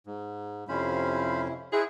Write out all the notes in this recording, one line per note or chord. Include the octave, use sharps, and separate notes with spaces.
G#2
F2 C3 C#4 E4 C5 F5 B5
E4 G#4 C5 D#5 F#5